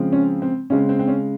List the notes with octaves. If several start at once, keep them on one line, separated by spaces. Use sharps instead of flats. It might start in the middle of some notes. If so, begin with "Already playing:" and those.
Already playing: C#3 F3 G#3 C4
C#4
C4
C#3 G#3 C4 C#4
C4
C4
C#4